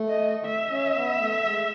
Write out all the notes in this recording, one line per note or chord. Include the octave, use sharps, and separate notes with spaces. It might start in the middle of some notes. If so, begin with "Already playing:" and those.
Already playing: A3
D#5
E5
C#4
B3
A3
G#3